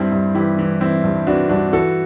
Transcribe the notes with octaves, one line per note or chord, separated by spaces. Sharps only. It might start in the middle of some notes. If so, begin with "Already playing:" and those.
Already playing: G2 C4 E4
G2
E3 E4 G4
E3
E3 C4 E4
G2
E3 D4 F#4
G2 D4 F#4
E3 F#4 A4